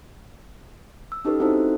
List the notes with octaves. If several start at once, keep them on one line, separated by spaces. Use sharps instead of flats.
E6
C#4 D#4 G4 A4 B4
C4 D#4 E4 F#4 A4 C5